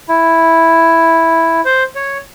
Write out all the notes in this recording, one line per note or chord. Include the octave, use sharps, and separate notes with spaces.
E4
C5
C#5